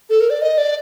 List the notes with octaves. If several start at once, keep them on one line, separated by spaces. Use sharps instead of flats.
A4
A#4
D5
D#5
D5